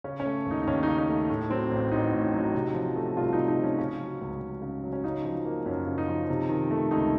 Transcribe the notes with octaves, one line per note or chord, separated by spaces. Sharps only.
C#3 C#4
C#4
A3
D#2 D#4
D#4
D#2 C#4
D#4
C#3
D#4
A3
A2
F#3 C4
A1
A1 D#4
A2
F#3
C3
F3
A3
C2 F4
C3 D#4
D#4
F3
C#4
C#3 C#4
F#3
C#2
C#2
C#3
F#3
C#4
C#3 D#4
F3
A#3
F#2 C#4
C#3
D#4
F3
C3
D#3
A3
C#2 D#4